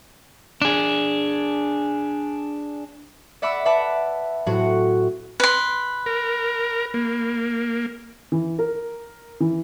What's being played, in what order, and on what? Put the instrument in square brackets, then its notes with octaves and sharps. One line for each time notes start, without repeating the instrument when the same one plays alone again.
[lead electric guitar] D4 G#4
[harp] D5 E5 F#5 B5 D6 E6
B4 E5 F#5 A5 B5 D6
A2 F#3 C4 F#4 F#5 C#6
[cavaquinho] B4 C6
[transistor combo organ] A#4
A#3
[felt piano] E3
A#4
E3